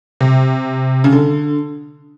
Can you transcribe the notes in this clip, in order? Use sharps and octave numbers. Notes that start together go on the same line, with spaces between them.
C3
C#3
D3